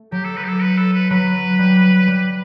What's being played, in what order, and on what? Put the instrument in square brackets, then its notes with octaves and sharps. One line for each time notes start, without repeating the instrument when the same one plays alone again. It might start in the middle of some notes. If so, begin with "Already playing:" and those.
Already playing: [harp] A3
[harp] F#3 [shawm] G4
[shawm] A4
B4
G4
A4
B4
A4
B4
[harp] F#3 [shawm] B4
[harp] G3
G3